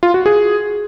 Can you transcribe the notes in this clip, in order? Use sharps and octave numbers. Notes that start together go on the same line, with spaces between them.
F4
F#4
G#4